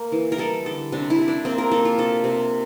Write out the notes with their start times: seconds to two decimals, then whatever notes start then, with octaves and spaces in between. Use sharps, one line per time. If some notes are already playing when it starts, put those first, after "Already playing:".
Already playing: A#3
0.12 E3
0.32 A#4
0.38 G3 A4
0.65 D3 A4
0.92 C3 D4
1.10 E4
1.18 C3
1.28 D4
1.45 A#3 C4
1.58 A#4
1.71 A#3 A4
1.85 F4
1.98 C3 A4
2.24 C3